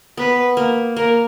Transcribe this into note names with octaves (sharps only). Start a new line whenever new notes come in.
B3 B4
A#3
A#3 A#4